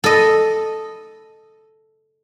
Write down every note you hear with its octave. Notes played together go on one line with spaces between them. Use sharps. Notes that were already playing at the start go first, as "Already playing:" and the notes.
A4 D#5